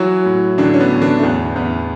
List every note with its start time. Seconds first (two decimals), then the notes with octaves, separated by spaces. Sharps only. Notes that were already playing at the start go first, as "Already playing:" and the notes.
Already playing: E3 F#3 F#4
0.26 A2
0.58 A1 D3 D4
0.74 C#4
0.80 B3
0.90 A1
1.01 D3 D4
1.19 A3
1.23 E2 B3
1.56 E2 B3